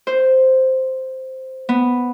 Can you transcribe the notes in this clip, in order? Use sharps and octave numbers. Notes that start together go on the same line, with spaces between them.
C5
B3